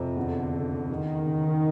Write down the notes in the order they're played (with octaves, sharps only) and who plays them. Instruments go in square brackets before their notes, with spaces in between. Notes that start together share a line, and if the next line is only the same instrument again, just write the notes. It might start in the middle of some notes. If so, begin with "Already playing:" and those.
Already playing: [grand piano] F2 C3
[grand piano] E2 [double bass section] D3
[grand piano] C#3
[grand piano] E2 [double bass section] D#3
[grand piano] C#3